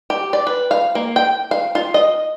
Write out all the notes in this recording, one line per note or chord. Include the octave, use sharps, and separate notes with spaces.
G4
D5
B4
F5
A#3
G5
F5
F4
D#5